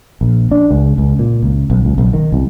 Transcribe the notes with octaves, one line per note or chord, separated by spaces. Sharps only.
A#1
D4
C#2
C#2
A#2
C#2
B1
C#2
B1
D#3
C2